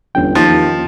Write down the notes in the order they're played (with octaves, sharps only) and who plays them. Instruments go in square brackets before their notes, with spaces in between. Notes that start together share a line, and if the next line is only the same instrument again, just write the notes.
[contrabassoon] G1 [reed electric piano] E2 C#4 G5
[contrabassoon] D#2 [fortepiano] F3